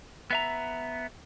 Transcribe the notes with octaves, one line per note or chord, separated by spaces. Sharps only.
B3 E5 A#5